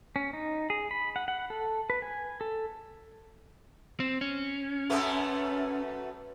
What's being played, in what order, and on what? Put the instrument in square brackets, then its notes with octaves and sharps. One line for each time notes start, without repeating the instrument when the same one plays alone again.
[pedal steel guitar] C#4
D#4
G#4
B5
F#5
F#5
A4
B4
G#5
A4
[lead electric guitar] C4
C#4
[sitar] F#2 A3 B3